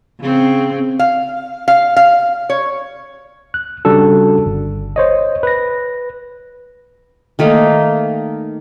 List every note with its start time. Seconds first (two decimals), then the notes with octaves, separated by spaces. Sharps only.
0.20 C#3 C4
0.99 F5
1.68 F5
1.96 F5
2.50 C#5
3.54 F#6
3.85 C#3 G3 D4 F#4 A4
4.46 G1
4.96 C5 C#5 D#5
5.43 B4 A#6
7.39 D#3 A3 A#3 D#4